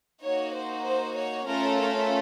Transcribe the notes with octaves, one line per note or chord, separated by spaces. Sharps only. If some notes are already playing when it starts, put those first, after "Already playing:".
A#3 D#4 F#4 C#5
C5
C5
C#5
A3 C#4 F4 A4 A#4
A#4